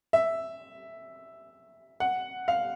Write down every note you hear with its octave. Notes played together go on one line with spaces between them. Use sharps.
E5
F#5
F5